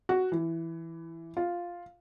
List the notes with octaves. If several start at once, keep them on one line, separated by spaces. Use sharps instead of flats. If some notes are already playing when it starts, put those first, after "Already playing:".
F#4
E3
F4